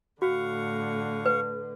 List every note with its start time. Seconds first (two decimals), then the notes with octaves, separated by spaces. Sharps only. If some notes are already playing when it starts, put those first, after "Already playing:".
0.22 A2 D3 F#4 F5 F#5 C#6
1.26 B4